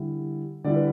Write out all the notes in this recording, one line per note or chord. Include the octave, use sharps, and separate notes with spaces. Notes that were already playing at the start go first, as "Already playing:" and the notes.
Already playing: D3 G3 E4
D3 G3 E4 D5
B4